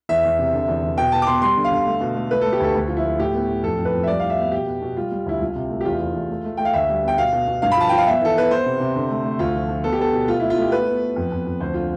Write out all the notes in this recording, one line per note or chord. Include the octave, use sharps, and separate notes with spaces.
E2 E5
E2
C3
D3
E2
E2
B2 G5
B3 A5
D6
B3 C6
G3 C6
D3
F5
D3
A3
B2
A3
A3 B4
A3 A4
G4
D2 A4
D2
F3 F4
E4
A3
A2 G4
B3
A2
F2 A4
F2
B4
F2
E5
G3 D5
A2 F5
E5
B3
B2 G4
B3
B2
G3 F4
G3
D2 E4
C2 F4
C3
A3
G4
E2 F4
E2
E2
A3
A3
A3 G5
F5
D2 E5
G3
B3 G5
B2 F5
B2
B2
G2 F5
B5
F3 A5
F3 G5
F5
B3 E5
E3 A4
B3 B4
B3 C5
C3
C3
D3
A3
A3
D2 F4
F3
F3
B3 A4
G4
B3 A4
B2
A3 F4
E4
A3
F4
A3 G4
B3 B4
B3
B3
F2
F2
F2
D2 C5
D3 F4